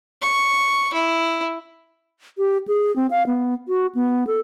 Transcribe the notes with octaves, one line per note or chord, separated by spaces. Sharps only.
C#6
E4
G4
G#4
C4
F5
B3
F#4
B3
A4